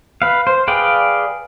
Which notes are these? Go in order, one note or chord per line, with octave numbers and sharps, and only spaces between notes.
B4 F5
C5
G#4 B4 D5 F5 G5